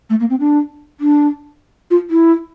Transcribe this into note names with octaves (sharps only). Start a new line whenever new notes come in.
A3
A#3
C4
D4
D4
F4
E4